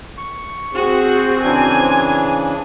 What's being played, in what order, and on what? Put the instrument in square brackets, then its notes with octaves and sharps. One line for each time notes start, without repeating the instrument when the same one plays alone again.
[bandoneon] C#6
[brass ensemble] C4 [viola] F#4 G#4
[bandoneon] C#3 E3 D4 [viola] G#5